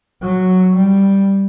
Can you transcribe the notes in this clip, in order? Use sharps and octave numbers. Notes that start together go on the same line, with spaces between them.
F#3
G3